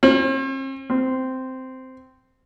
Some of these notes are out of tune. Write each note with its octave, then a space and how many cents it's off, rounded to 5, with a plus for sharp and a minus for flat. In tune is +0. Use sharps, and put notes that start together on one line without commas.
C4 +45
C4 -10